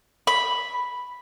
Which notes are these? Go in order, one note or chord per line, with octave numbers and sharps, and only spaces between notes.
B5